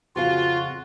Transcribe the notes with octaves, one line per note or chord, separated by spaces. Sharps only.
F2 C#3 F4 F#4 F5